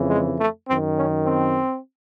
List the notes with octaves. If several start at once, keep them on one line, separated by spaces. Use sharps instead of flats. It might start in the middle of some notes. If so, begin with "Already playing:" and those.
Already playing: F2 C#3 E3
G#3
A3
F#2 D#3 C4
C#4
C4